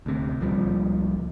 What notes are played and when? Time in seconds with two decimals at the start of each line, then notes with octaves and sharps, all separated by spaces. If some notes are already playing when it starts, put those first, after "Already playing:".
0.06 D2 C3
0.41 C#2 A#2 F3 G3